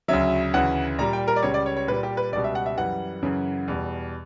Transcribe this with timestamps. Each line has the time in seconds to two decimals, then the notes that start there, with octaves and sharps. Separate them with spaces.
0.08 D2 C#3 F#3 E5
0.54 D2 C#3 E3 F#5
0.98 A#2 G3 A#5
1.13 G5
1.28 A#4
1.36 D5
1.42 C#2 C#3 G3 C#5
1.54 D5
1.66 C#5
1.77 C#5
1.88 A#2 G3 B4
2.03 G4
2.17 B4
2.32 C#2 B2 G3 D5
2.44 E5
2.55 F#5
2.66 E5
2.77 F#2 E3 G3 F#5
3.22 F#2 C#3 E3
3.68 E2 B2 G3